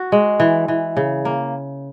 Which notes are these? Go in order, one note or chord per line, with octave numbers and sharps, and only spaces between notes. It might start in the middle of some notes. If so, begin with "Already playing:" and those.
Already playing: F#4
G#3
E3
E3
C#3
A#3